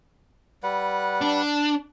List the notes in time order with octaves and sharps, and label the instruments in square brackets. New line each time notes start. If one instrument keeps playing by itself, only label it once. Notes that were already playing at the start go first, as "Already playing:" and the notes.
[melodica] G3 B4 F#5
[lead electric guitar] D4